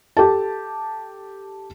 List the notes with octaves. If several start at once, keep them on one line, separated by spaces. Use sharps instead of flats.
G4 A4 A5